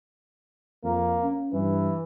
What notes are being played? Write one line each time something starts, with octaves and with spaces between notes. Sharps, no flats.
F2 A#3
C#4
G2 E3